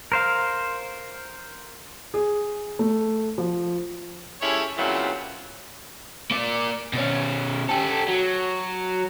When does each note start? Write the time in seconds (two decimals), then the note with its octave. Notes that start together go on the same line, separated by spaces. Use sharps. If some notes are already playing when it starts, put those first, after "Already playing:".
0.12 A#4 C5 F5
2.14 G#4
2.79 A3
3.38 F3
4.42 G#3 C#4 E4 G4 A4 C#5
4.78 A#2 C#3 E3 F#3 G3 C4
6.31 A#3 D5
6.93 B2 C#4
7.69 G4 A4
8.08 F#3